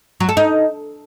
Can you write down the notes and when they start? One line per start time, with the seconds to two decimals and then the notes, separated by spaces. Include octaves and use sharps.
0.20 F#3
0.29 A4
0.37 D#4